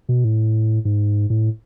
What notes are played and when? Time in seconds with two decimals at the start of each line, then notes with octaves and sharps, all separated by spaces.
0.09 B2
0.24 A2
0.85 G#2
1.30 A2